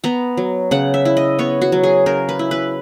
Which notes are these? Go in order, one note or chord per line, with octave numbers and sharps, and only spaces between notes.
B3 A#5
F#3
C#3 F#5
E5
E4
D#5
B3 C#5
F#4
F#3
G#4
C#3 A#4
B4
E4
B4